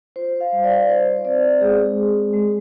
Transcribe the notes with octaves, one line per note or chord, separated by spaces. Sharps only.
F4 C5
F5
G3
D5
D#4 C5
C5
C4 D5
G#3 G#4
G#3
G#3